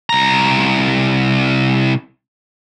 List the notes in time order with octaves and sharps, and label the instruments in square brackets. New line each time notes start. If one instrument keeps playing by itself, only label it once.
[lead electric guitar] C2 A#5